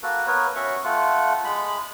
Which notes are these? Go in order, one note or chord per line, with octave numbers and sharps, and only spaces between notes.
A#3 F#4 A4 B4
B3 A#4 B4 C#5
C#4 F#4 E5 C#6
A3 F4 F#5
G#3 B5